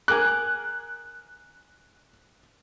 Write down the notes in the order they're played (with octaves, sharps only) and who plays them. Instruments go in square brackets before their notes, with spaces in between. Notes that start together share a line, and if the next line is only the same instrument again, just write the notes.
[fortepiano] G#4 A#4 D6 [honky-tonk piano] F#6